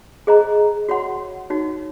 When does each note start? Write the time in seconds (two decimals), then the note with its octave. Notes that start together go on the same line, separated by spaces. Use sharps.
0.27 G#4 C5 D#5 A#5
0.89 F#4 C#5 F#5 C6
1.50 D#4 F#4 C#5